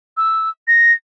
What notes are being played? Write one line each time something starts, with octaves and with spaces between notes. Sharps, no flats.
E6
A#6